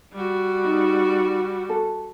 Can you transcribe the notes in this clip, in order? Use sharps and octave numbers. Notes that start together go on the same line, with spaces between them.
G3 F#4
D#4
A4